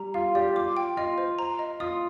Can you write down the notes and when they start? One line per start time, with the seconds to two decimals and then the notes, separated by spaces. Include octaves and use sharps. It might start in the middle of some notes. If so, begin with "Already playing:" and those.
Already playing: G3 A#5
0.14 F4 F5
0.35 G4 D5
0.55 F4 D6
0.77 G5
0.97 F4 D#5
1.18 C5
1.39 A#5
1.59 D#5
1.80 F4 D#6